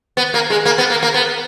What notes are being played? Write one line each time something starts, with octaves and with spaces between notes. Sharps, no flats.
B3
A#3
G#3
A#3
B3
A#3
A#3
B3